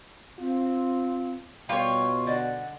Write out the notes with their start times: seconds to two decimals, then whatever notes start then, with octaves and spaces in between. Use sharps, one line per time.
0.39 C4 F4
1.69 B2 G3 F4 C#5 G5
2.27 D3 D5 D#5 F#5